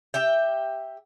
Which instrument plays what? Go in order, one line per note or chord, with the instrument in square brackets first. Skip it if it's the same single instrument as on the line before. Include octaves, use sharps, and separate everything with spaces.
[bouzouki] G4 E5 G5